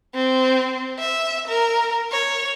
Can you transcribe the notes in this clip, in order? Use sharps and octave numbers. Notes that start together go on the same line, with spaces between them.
C4
E5
A#4
C#5